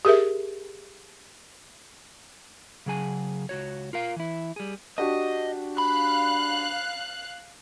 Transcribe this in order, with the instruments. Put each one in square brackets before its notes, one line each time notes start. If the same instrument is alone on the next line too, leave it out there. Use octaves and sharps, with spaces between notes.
[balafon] G4 G#4 A#4 E5
[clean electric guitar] C#3 F#3 G#4 G#5
C#2 F#4 C#5
F4 A#4 F5
E3 E4
G3 G#4
[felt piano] D4 F#4 G4 [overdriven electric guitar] D#5
[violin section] F5 F#6 [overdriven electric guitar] B5